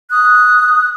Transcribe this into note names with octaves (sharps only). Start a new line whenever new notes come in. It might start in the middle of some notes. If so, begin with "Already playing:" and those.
D#6 F#6